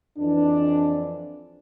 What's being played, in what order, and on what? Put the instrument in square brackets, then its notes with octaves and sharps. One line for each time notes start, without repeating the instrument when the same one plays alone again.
[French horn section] F2 E3 D4